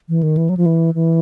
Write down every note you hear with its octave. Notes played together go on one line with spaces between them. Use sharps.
E3
D#3
E3
F#3
F3
E3
E3